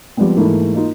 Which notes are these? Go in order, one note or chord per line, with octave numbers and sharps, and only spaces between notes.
F3 G3 G#3 B3 C4
G#2 E3 A3 A#3 E4
A#3 D#4 F4